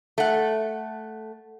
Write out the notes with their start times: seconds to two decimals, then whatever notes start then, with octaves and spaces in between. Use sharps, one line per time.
0.18 A3 F#5